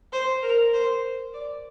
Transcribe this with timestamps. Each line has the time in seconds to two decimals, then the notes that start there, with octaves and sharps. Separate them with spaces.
0.13 C5
0.42 A#4
0.73 C5
1.33 D5